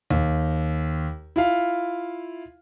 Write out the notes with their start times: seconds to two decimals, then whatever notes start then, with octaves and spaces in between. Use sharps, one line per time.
0.11 D#2
1.36 E4 F4 F5